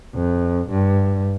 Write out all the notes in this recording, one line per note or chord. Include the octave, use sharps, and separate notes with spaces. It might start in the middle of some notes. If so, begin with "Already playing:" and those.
F2
G2